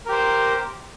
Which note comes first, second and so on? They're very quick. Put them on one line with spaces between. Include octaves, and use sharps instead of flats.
A#4 G4 C5